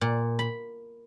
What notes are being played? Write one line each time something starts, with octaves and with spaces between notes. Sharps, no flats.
A#2
B5